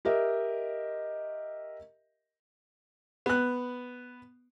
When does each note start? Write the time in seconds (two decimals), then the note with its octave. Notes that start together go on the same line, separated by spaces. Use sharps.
0.05 G4 A#4 D#5 E5
3.26 B3 F#6